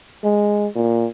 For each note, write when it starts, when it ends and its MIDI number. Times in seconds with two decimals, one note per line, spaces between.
0.24 0.67 56
0.75 1.07 46